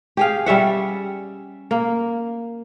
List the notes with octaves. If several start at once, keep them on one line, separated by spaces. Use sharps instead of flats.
G4 G#4 F5
G3 C#4 E5 F#5
A#3